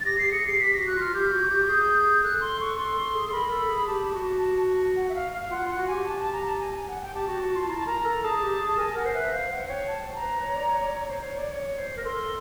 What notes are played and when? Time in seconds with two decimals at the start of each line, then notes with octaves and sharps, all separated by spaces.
0.01 A6
0.05 G4 A#6
0.18 G4 C7
0.32 G#4 C#7
0.46 G4 C7
0.59 G4 B6
0.74 F#4 A#6
0.87 F#6
0.96 F4 F6
1.14 G4 G6
1.32 F#4
1.43 F#4
1.51 G4
1.68 G#4
2.23 A4 F#6
2.41 C6
2.60 C#6
2.77 A4 C6
2.96 A4
3.14 G#4
3.28 A4
3.32 A#4 B5
3.51 A4
3.68 G#4
3.87 G4 A5
4.15 F#4
4.96 F#5
5.09 E5
5.15 F5
5.32 F5
5.51 F4 F#5
5.64 F4 F#5
5.78 F#4
5.87 G4 G#5
6.05 A5
6.19 A5
6.33 A#5
6.47 A5
6.59 G#5
6.74 G#5
6.88 F#5
7.01 G5
7.14 G4 A5
7.28 F#4
7.42 F#4
7.55 F4
7.69 E4 A#5
7.78 A5
7.87 A#4 A#5
8.05 A4
8.23 G#4 A5
8.42 G4
8.59 G#4
8.78 A#4 G#5
8.96 A#4 F#5
9.05 C5
9.14 B4 E5
9.32 C5 F5
9.51 C5 F#5
9.69 C#5 G5
9.87 A5
10.06 C5
10.15 A#5
10.23 B4
10.42 C#5
10.56 D5
10.69 C#5
10.83 D5
10.96 C#5
11.10 C5
11.24 C#5
11.37 D5
11.51 C#5
11.79 C5
11.97 A#4
12.05 A4 C6